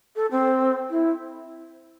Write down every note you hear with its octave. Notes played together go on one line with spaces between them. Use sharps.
A4
C4
E4